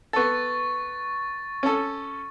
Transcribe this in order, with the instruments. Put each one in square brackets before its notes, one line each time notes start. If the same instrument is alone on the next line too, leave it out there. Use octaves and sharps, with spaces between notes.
[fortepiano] B3 A4 [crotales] C#6 A6
[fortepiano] C#4 A4